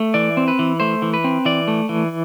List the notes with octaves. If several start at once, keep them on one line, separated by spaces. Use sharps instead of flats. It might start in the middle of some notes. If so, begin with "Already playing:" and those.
Already playing: A3
E3 D5
C4
B4
E3
A3 C5
E3
B4
C4
E3 D5
A3
E3